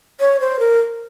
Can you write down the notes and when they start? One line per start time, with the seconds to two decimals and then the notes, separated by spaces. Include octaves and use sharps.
0.20 C#5
0.40 C5
0.59 A#4